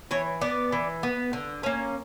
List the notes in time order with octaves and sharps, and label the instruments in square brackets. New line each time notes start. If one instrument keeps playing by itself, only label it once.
[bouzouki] E3 C#5
B3 D5
E3
B3
D3
A#3 C#4